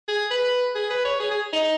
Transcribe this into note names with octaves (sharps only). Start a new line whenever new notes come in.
G#4
B4
G#4
B4
C#5
G#4
G#4
D#4